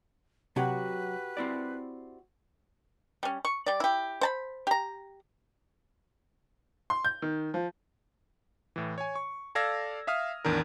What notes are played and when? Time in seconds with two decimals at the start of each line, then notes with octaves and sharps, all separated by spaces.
0.56 C3 F#3 F#4 G4 B4 F#5
1.37 C4 E4 D5
3.23 G3 C#4
3.45 C#6
3.66 G3 D5
3.80 E4 G4
4.21 C5 A5 B5
4.67 G4 A#5
6.90 C6
7.05 G6
7.22 D#3
7.54 F3
8.76 A2 E3
8.98 C#5 G#5
9.16 C#6
9.55 A4 D5 F5 E6 G#6 A#6
10.07 E5 F5 D#6 F6
10.45 A1 E2 D#3 D4 A#4